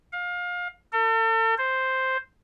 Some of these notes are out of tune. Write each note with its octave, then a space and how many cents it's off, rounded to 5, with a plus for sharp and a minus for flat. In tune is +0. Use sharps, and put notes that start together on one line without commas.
F5 +30
A4 +40
C5 +0